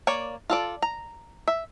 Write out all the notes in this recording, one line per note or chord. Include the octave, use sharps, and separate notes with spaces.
A#3 C#5 D5
F4 A4 D5
A#5
E5